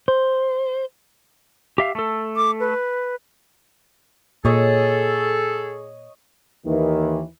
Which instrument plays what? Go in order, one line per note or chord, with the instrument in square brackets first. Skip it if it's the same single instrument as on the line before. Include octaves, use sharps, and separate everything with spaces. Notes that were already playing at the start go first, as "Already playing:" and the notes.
[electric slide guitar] C5
G4 E5 F5
A3 A4
[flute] D6
B4
[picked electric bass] A#2 [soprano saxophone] G#4 [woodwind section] A4 [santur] C#5 D#5
[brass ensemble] D#2 D#3 E3